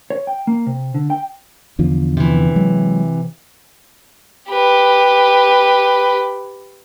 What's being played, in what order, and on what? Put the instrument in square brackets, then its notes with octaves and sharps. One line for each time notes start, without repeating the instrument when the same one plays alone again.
[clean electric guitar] C#5
G5
A#3
C3
D3
G5
[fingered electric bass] E2 D3 F3
[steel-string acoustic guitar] C3 E3
[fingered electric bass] F#3 G#3
[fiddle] G4 B4